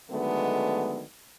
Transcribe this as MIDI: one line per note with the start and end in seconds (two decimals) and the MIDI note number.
0.11 1.03 50
0.11 1.03 51
0.11 1.03 54
0.11 1.03 56
0.11 1.03 57
0.11 1.03 59